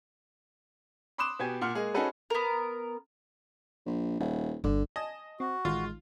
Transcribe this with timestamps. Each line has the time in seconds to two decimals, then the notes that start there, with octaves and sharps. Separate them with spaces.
1.18 B5 C6 D6 D#6 F#6 E7
1.39 B2 B3 G4 G#5 G#6
1.61 A#2 F#5 C6 F6 C#7
1.75 G#3 A#3 G#4
1.94 C#4 D#4 F#4 G#4 A4 B4
2.30 B3 A#4
3.86 A#1
4.20 D#1
4.64 G1 D3
4.96 D#5 G#5 A5 E7
5.40 C4 F#4
5.65 A1 D#3 G#3 F4